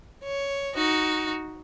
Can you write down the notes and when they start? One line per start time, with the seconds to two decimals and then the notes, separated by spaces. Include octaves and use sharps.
0.23 C#5
0.75 D#4 F#4